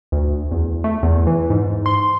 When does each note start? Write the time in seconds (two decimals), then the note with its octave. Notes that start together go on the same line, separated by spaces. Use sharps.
0.12 D2
0.51 E2
0.84 A3
1.03 E2
1.27 E3
1.50 G#2
1.86 C6